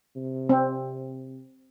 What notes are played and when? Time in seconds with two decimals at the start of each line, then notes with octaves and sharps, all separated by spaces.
0.16 C3
0.49 C4